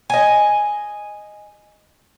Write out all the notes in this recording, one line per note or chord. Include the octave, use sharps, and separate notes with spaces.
D#5 G#5